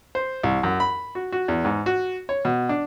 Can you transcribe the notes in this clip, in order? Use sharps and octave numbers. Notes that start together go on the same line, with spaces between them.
C5
C2
F#2
B5
F#4
F#4
E2
G#2
F#4
C#5
B2
D4